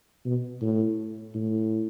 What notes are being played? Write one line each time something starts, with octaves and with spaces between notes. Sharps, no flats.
B2
A2
A2